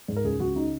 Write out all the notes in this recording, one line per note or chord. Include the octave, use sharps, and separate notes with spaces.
G#2
A#4
C#2 G#4
C#2 F#4
C#3 D#4